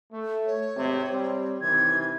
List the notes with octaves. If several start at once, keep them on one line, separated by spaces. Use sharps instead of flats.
A3
C#5
G#1 C3
G3 C4
C3 D#3 E3 G#6